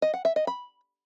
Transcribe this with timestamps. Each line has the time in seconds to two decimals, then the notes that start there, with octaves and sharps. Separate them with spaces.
0.02 D#5
0.14 F#5
0.25 E5
0.36 D#5
0.47 B5